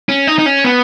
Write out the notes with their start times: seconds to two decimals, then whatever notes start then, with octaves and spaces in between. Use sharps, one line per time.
0.09 C#4
0.27 D#4
0.39 D#4
0.46 C#4
0.64 B3